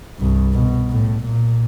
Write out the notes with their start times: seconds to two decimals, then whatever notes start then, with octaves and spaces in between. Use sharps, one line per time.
0.18 C2 G2
0.54 B2
0.90 A2
1.24 A#2